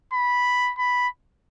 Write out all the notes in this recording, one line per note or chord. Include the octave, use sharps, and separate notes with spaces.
B5
B5